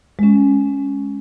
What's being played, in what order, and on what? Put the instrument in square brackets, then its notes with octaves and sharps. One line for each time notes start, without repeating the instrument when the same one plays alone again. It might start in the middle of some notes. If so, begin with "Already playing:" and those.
[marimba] G#3 C#4